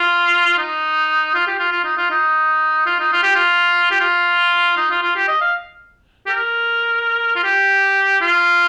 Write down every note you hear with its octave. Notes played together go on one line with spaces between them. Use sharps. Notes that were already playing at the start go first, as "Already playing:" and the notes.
Already playing: F4
D#4
F4
G4
F4
F4
D#4
F4
D#4
F4
D#4
F4
G4
F4
G4
F4
D#4
F4
F4
G4
D#5
F5
G4
A#4
F4
G4
F4